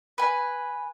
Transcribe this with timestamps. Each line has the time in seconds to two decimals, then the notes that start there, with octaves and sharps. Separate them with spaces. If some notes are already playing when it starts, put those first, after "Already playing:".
0.18 B4 G#5